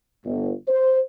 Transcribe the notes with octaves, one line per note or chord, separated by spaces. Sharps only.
G1
C5